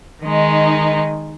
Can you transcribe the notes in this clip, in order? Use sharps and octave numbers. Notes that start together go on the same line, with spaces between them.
D#3 G#3 D#4